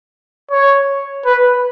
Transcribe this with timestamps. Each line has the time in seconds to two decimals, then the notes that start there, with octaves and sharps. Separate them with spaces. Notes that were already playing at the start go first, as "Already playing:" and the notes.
0.51 C#5
1.26 B4